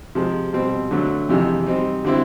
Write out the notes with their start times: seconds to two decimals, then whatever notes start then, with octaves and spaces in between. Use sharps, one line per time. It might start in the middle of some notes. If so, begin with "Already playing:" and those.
0.15 C3 F3 G#3
0.53 B2 G3 C4
0.91 D3 F#3 A3
1.29 F2 C3 E3 G#3
1.66 G3 C4 D#4
2.05 D3 G3 C4 E4